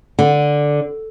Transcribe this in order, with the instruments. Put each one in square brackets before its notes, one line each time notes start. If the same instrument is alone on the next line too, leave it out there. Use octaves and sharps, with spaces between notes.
[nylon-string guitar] D3